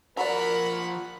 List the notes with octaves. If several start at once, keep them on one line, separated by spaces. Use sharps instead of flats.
F3 F#3 F#4 A#4 D5 F#5 A#5 B5